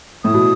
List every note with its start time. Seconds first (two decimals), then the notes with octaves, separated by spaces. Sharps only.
0.24 A2 D#6
0.34 B2